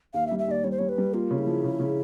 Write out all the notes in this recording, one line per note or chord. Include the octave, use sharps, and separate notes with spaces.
D#2 F5
E5
G3
E5
D#2 D5
G3 C#5
C5
G3 C#5
B4
G3
A#3 F4
C#3
E4
F3
C#3
C#3